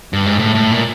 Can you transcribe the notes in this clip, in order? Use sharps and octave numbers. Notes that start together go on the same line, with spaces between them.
G2
G#2
A2
A2
A#2